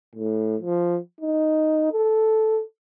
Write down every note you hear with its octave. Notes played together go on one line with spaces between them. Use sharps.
A2
F3
D#4
A4